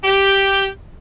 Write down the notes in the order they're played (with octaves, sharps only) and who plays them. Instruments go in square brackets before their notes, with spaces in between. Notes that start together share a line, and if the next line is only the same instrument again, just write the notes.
[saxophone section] G4